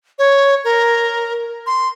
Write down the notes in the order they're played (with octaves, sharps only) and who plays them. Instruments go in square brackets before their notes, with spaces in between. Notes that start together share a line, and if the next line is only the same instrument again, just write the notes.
[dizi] C#5
A#4
C6